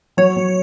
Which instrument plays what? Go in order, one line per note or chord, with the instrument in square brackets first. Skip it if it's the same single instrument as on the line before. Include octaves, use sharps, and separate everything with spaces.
[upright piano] F#3 [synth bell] C#5
[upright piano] F#3